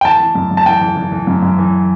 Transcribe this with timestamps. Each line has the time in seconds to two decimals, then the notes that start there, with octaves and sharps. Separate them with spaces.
0.01 G5
0.05 E3 A5
0.20 E3
0.35 F#2
0.51 F#2
0.57 A5
0.66 E3 G5
0.81 E3
0.96 E3
1.12 E3
1.27 F#2
1.42 F#2
1.58 E3